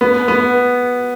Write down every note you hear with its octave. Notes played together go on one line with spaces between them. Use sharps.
B3
B3